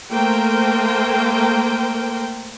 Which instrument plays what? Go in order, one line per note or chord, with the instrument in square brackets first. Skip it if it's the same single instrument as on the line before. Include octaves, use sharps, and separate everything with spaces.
[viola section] A3 A#3 A#4 C5 G5